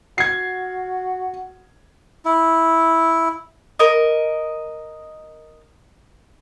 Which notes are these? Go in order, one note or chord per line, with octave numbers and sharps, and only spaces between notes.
F#4 G#6 C7
E4
A#4 D#5